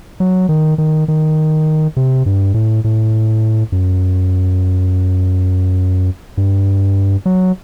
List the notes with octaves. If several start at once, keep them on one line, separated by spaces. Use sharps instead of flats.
F#3
D#3
D#3
D#3
C3
G2
A2
A2
F#2
G2
F#3